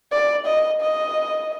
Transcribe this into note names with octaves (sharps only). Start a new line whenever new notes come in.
D5
D#5
D#5